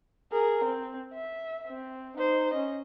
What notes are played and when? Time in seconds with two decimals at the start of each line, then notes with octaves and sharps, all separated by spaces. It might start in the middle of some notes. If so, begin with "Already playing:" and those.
0.32 G#4 A#4
0.64 C4
1.13 E5
1.68 C4
2.17 D#4 C5
2.53 C#4 D#5